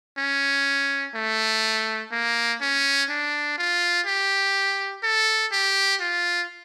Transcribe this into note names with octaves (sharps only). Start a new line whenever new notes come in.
C#4
A3
A#3
C#4
D4
F4
G4
A4
G4
F4